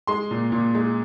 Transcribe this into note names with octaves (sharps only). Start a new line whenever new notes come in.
G#3 C6
A#2
A#2
G#3